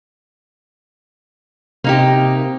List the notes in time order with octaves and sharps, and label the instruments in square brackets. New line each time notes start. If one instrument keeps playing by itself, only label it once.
[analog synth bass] C3 [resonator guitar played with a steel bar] A#3 D#4 G4